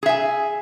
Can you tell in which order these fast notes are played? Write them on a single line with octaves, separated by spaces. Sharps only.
G#4 E5 G#5